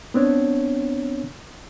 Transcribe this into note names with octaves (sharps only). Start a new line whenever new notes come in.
B3 C4 D4 C#5